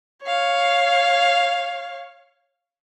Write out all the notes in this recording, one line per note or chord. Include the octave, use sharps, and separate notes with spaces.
C#5 F5